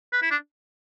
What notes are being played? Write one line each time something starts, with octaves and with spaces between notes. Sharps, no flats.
B4
E4
D4